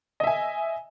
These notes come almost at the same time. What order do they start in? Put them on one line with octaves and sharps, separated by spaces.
D#5 E5 G#5